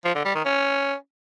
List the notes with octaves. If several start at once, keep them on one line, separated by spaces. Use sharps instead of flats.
F3
D3
G3
D#3
C#4